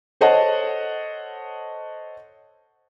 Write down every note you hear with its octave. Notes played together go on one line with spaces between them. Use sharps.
A4 C5 C#5 D#5 F#5 A5